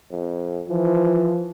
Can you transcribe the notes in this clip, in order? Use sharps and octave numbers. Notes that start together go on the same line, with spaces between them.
F2
E3 F3